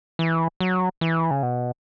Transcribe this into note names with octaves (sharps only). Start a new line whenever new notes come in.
E3
F#3
E3
C#3
B2